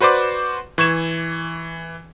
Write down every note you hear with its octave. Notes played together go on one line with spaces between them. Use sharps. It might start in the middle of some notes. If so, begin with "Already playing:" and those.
F#4 B4 C5 D5 D6
E3 C#6 G#6 E7